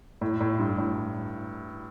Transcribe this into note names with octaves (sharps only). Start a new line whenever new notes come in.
A2
A2
G2
A2